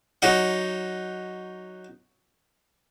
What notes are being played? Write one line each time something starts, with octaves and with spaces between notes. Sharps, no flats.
F#3 D#4 F#5